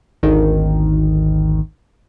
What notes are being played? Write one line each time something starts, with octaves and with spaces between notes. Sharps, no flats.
G#1 D2 D#3